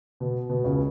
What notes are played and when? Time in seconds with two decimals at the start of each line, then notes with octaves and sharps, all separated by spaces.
0.20 B2
0.49 B2
0.64 C#2 C#3